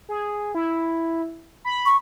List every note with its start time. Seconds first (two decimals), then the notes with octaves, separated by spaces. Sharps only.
0.09 G#4
0.55 E4
1.65 B5
1.86 C#6